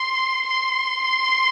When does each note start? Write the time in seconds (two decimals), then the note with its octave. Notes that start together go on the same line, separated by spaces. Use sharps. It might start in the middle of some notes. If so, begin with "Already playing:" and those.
Already playing: C6
0.47 C6